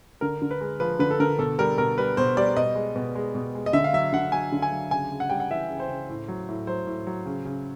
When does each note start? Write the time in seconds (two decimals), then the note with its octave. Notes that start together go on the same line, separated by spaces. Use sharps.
0.21 D3 A#4
0.42 D3
0.51 B4
0.61 G#3
0.80 F3 B4
0.99 D3 B4
1.11 A4
1.20 D3 A#4
1.39 B2 A4
1.59 G3 A#4
1.78 B2 A#4
1.98 G3 B4
2.17 B2 C5
2.37 G3 D5
2.56 B2 D#5
2.75 G#3
2.96 B2
3.15 G#3
3.35 B2
3.55 G#3
3.66 D#5
3.73 D3 E5
3.84 F5
3.93 F#3 E5
4.13 D3 F#5
4.32 F#3 G#5
4.52 D3
4.62 G#5
4.72 F#3
4.91 C#3 G#5
5.11 C#3
5.20 F#5
5.30 G3 G5
5.40 F#5
5.51 E3 E5
5.69 C#3
5.80 C5
5.89 C#3
6.09 A2
6.28 F#3
6.49 A2
6.67 F#3 C5
6.87 A2
7.07 F#3
7.26 C#3
7.45 C#3